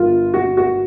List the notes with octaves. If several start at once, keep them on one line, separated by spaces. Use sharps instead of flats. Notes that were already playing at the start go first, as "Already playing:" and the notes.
Already playing: G1 A#3 F4
F#4
F#4